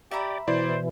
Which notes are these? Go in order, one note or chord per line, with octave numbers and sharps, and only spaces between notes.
G4 D5 E5 A#5 B5
B2 E3 E4 C5 D5